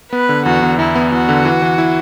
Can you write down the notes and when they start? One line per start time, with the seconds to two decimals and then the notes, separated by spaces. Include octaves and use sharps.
0.13 B3 B4
0.29 D3
0.45 E2 F#4
0.62 E2
0.78 E2 E4
0.95 B3
1.12 E2 F#4
1.29 D3
1.45 E3
1.62 E3
1.78 E4